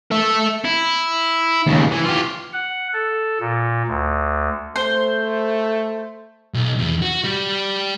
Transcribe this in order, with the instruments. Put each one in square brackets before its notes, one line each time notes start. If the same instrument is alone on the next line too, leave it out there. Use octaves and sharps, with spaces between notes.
[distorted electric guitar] A4 E5
E4
D#2 C#3
E3
F4 G4
[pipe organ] F#5
A4
A#2
D2
[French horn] A3 [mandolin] C5
[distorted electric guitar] B1
E2
F#4
G3